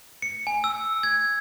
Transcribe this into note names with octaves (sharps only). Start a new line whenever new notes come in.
C#7
G#5
E6
G#6